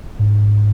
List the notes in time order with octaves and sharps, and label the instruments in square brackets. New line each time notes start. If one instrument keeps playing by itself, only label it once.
[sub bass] G#2